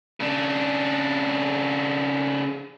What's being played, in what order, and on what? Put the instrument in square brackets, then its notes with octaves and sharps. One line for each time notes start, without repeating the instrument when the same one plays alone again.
[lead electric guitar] C#3 D4